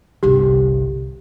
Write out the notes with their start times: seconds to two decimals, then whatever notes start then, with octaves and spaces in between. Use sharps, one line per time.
0.23 G1 C2 G4